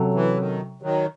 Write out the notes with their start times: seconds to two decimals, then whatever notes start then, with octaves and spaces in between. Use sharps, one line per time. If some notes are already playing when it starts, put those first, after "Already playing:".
Already playing: C3 F#3 C#4 F#4 A4
0.14 E3
0.37 D#3
0.82 D#3 F#3